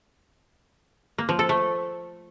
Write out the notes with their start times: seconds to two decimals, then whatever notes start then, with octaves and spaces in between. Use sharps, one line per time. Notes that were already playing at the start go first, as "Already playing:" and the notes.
1.18 A#3
1.29 F3
1.39 A4
1.49 A3